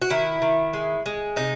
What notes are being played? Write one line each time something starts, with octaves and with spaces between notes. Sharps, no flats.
F#4
D#3 E4
D#3
G#3
G#3
C3 D#4